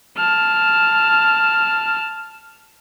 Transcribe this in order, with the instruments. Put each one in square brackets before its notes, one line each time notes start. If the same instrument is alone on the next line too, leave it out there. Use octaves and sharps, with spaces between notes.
[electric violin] A5 F6